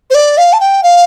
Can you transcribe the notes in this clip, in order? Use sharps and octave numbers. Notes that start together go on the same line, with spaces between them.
C5
D5
F5
A5
G5
F5